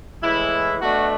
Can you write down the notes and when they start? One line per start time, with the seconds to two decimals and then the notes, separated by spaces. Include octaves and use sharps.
0.23 A2 E3 G#3 E4
0.80 B2 A3 D4 F#4